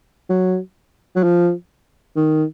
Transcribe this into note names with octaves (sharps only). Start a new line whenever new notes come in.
F#3
F#3
F3
D#3